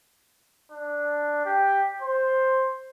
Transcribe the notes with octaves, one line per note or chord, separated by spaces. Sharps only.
D4
G4
C5